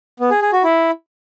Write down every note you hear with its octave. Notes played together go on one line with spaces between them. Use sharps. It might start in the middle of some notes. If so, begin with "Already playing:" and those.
B3
G#4
G#4
F#4
E4